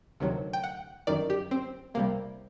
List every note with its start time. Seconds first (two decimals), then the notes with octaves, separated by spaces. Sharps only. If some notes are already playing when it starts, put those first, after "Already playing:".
0.20 D2 C3 D#3 F#3
0.53 G5
0.64 F#5
1.07 G1 F#2 D#3 D5
1.30 G4
1.51 C4
1.94 C2 C3 G3 A#3